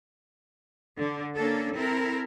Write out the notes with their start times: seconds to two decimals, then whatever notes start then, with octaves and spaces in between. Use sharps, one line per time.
0.98 D3
1.37 A#3 C#4 D4 A4
1.75 C4 E4 A4 A#4